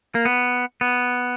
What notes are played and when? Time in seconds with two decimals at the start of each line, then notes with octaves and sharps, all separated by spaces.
0.15 A#3
0.25 B3
0.81 B3